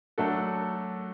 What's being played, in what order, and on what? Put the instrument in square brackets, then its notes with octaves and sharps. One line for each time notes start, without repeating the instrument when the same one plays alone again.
[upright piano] F#3 A3 D4 F#4 A4